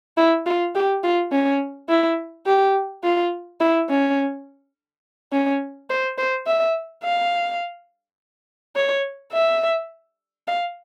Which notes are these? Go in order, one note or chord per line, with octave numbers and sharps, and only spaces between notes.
E4
F4
G4
F4
C#4
E4
G4
F4
E4
C#4
C#4
C5
C5
E5
F5
C#5
E5
F5